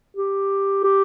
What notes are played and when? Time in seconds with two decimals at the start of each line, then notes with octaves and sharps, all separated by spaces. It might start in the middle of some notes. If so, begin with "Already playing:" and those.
0.17 G4
0.84 G4